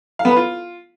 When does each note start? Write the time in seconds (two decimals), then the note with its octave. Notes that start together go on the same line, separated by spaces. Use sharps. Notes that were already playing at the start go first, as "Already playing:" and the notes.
0.19 F5
0.25 B3
0.31 B4
0.36 F4